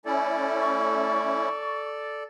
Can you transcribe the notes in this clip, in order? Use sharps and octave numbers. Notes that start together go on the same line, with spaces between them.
A3 C#4 E4 A4 D5 G#5
C#6